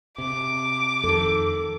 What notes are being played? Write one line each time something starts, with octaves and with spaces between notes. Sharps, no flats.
C3 D6
F2 D#3 A4